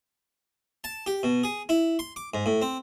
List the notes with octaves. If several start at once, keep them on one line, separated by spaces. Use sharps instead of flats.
A5
G4
B2
G#4
E4
C6
D6
G#2
A2
C4